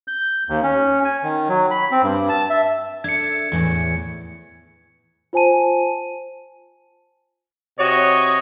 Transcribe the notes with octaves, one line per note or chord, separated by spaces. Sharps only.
G6
D#2
C#4
G#5
D#3
F#3
B5
C4
G2
A5
E5
D4 A4 E5 G#6 C#7
E2 A2 E3
F4 C5 G#5 A5 D#7
C3 F#4 C#5 D#5